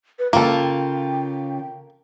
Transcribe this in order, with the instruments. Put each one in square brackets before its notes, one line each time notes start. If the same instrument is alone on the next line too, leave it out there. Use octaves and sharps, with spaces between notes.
[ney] B4
[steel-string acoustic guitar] C#3 F4 [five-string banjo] A#3 A4 [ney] G5